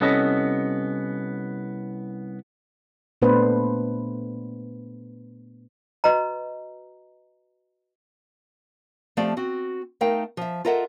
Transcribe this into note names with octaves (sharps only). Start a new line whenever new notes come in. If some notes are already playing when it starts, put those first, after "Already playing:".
C2 B3 C#4 A4 D#5 B5
A#2 A3 B3 D4 B4 C5
F#4 B4 D#5 A#5
F3 A3 C4 G4 D5 F5
C4 F#4
A3 D#4 A#4 F5 G5
F3 E5
F4 A4 A#4 D#5 E5 F#5